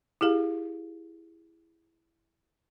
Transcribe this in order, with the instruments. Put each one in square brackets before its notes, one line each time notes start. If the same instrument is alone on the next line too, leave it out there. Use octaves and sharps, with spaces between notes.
[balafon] E4 G4 G#4 F5